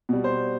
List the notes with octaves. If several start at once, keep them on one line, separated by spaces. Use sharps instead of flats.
B2 G3
C5